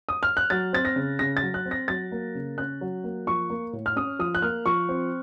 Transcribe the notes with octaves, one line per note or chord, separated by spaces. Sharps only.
D#6
F6
F#6
F#3 A6
C4 A6
A#6
C#3
C#3 A#6
A6
F#3
F#6
C4
A#6
F#3 A6
A#3
C#3
C#4 F#6
F#3
A#3
F3 C#6
A#3
A2
F6
C#4 D#6
F3 D#6
F#6
A#3 F6
F3 C#6
C4